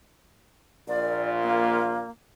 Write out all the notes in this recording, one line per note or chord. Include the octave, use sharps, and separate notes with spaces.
A#1 A#2 F4 D5
A#3